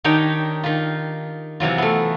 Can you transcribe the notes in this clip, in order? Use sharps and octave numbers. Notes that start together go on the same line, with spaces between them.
D#3 D4 D#4 G4 C#5 G5
D#3 F4
C3 E3 F#3 F4
A3 B3